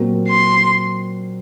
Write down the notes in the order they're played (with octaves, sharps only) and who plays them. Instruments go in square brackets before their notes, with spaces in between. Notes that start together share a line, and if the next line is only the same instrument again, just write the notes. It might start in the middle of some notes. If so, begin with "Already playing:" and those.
Already playing: [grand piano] A#2 F#3 C4 F#4 A#4
[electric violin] C6